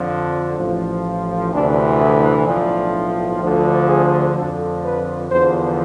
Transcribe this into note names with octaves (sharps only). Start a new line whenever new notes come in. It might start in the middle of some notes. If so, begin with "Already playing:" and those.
Already playing: F2 D3 F3
A1 A2 F3
D2 C3 E3 D4
E4
B1 A2 F3 D4
D2 D3 F3
G#4
F2 D3 F3 A4
B4
E2 D3 F3 C5